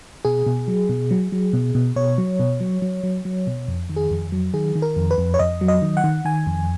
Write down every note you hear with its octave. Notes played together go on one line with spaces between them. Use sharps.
B2 G#4
B2
F#3
B2
F#3
F#3
B2
B2
B2 C#5
F#3
B2
F#3
F#3
F#3
F#3
B2
F2
D#3
G#4
F2
F#3
D#3 G#4
D#3
A#4
F2
B4
F2
C#5
F2 D#5
F#3
D#5
D#3
F#5
D#3
D#3 G#5
F2